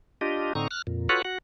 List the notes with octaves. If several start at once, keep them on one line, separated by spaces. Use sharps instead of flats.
D4 F4 G4 D#5
A2 D3 C4 D#4 A#5 C#6
F6 F#6
F2 A#2
F4 F#4 A4 B4 C#5 F#5
F#4 F#5